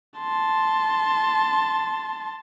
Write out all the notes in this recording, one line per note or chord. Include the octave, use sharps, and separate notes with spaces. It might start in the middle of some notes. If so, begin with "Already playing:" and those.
A5 C6